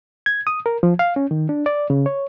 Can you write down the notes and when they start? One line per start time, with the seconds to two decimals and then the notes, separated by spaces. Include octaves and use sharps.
0.26 G#6
0.47 D#6
0.66 A#4
0.83 F3
0.99 F5
1.16 C#4
1.31 D#3
1.49 D4
1.66 D5
1.90 C#3
2.06 C#5